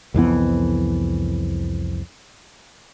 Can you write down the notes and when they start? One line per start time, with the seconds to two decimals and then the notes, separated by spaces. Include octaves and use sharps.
0.14 C2 F2 E3 B3